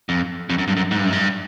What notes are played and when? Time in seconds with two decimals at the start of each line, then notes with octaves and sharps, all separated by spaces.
0.09 F2
0.50 F2
0.58 F#2
0.68 G2
0.77 F#2
0.91 G#2
0.98 G2
1.05 F#2
1.13 G2